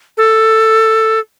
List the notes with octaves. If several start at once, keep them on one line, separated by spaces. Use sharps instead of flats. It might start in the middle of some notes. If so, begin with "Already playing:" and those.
A4